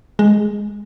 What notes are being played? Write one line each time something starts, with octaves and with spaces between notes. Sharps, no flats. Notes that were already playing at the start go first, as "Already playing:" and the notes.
G#3